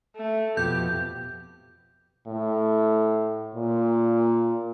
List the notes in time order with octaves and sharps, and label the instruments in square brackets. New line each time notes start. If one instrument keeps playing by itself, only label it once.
[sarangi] A3
[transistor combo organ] F2 B2 [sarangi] G4 [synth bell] G6
[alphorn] A2
A#2